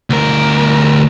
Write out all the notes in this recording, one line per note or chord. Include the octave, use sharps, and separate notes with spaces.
D2 A#4